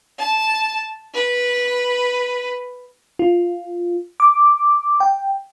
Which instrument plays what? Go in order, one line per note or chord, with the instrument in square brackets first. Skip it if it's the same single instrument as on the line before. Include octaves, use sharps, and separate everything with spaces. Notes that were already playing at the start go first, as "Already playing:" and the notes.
[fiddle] A5
B4
[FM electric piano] F4
D6
G5